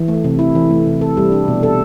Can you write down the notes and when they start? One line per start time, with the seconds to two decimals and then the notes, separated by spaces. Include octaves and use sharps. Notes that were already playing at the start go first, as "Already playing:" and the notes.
Already playing: E3
0.08 A3
0.24 C3
0.39 E4
0.55 E3
0.70 A3
0.86 C3
1.01 A4
1.17 G3
1.32 D4
1.48 B2
1.63 A4